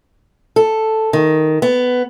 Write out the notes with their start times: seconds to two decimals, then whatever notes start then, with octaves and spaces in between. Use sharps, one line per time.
0.56 A4
1.13 D#3
1.62 B3